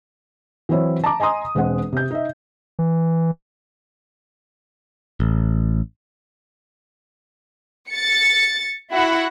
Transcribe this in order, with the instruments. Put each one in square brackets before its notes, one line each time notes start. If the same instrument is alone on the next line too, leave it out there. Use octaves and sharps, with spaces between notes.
[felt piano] E3 F#3 C4 E4 C#5
A5 A#5 D6
D#5 G#5 A#5 C6 D#6
E1 G#3 C4 G#4 F#5
C3 G6
D#4 E5
[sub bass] E3
[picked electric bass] A1
[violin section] A6 C#7
E4 F#4 F#5